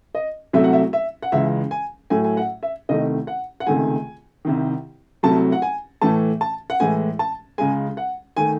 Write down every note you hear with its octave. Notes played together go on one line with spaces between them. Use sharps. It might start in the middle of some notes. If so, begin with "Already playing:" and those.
D#5
C2 C3 F#3 A3 E5
F#5
E5
E5
F#5
C#2 C#3 E3 G#3 E5
G#5
A2 F#3 A3 G#5
G#5
F#5
E5
C2 C3 D#3 A3 D#5
F#5
F#5
C#2 C3 D#3 A3 G#5
C2 C3 D#3
C2 C3 F#3 A3 A5
F#5
G#5
A2 E3 A3 A5
A5
F#5
A2 E3 G#3 G#5
A5
C#2 C#3 G#3 G#5
F#5
D#3 A3 G#5